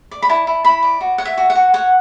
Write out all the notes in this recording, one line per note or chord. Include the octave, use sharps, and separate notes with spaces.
D5
B5
E4 A5
E4
E4 B5
D5
F#4
C#5 F#5
E5
F#4
F#5
F#4
C#5 F#5